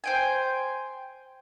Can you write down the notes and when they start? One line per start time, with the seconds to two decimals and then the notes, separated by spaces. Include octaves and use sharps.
0.04 C5 G5 G#5